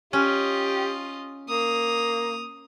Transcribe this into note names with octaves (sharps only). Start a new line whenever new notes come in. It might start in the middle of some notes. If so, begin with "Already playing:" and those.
C#4 F4 G4 D#5
A#3 D#6 F7